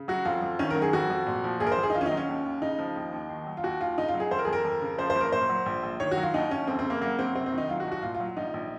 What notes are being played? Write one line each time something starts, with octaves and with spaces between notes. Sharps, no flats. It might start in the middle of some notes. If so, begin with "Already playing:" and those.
Already playing: C#3
F#3 F#4
F2 F4
F2
D#3 C#4
A#4
F#3
G#4
F2 F#4
F2
A#2
F3
A#1 G#4
A#4
C5
A#1
G#4
D#4
D#3 F4
C#4
D#4
F#3
C#4
D#2
D#2
C#3 D#4
F3
D#2
D#2
D#3
F#3
F4
D#2 F#4
D#2 F4
C#3 D#4
F4
F#3
G#4
F2 C5
A#4
G#4
F2
A#4
F2
C#3
F3 C5
C5
F#1
A#4
A#2 C5
F#3
A#1
A#1
D#3 C#5
F#4
F#3
F4
D#2 D#4
D#2 C#4
F2 C4
C4
C#3
A#3
F#3 A#3
F#1 C4
C3 C4
C4
D#3
D#4
F#3 F4
F#4
C2
F#4
A#2 F4
F4
F#3
A#1 D#4
A#1